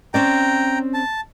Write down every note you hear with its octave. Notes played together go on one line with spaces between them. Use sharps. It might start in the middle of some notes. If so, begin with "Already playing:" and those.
C4 C#4 D5 G5 A#5
A5